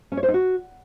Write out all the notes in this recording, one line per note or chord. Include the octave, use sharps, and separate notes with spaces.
C#4
C#5
C5
D#4
F#4